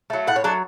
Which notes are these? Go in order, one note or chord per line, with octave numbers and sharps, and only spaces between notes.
F#3 A3
A2 F#5
C#5
F#3 A3 D4